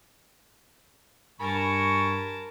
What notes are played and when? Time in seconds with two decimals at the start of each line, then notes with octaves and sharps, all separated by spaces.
1.40 G2 A#4 G#5 A5 B5 C#6